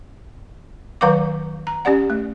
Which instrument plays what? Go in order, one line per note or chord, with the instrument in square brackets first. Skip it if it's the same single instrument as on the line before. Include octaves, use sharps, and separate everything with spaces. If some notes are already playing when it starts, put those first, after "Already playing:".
[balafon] D#3 F#3 B4 F5 F#5 D6
A#5
C#4 G4 D5 F#5
A3